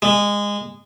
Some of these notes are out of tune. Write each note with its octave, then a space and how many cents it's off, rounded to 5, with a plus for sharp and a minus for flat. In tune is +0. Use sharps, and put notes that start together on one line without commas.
G#3 -20